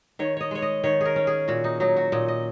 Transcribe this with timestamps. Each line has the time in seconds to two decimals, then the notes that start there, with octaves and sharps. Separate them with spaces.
0.19 D#3 C#5
0.37 C#5 D#5
0.51 G#3 C#5
0.62 D#5
0.84 D#3 C#5
1.01 G#4 A#4
1.16 C#4
1.27 G#4
1.48 A#2 F#4
1.64 D#4
1.80 F#3 D#4
1.96 F#4
2.12 A#2 D#5
2.28 D#5